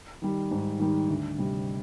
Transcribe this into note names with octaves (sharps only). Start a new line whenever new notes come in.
D#3 G3
G#2
D#3 G3
D2
C3 G3